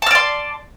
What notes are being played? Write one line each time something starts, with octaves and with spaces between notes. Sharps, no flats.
D5 A5 C6 F6